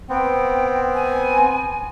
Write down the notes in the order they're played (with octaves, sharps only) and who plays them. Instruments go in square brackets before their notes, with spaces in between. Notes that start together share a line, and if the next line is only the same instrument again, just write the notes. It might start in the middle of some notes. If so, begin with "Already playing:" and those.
[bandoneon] B3 C4 [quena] G5
[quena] G#5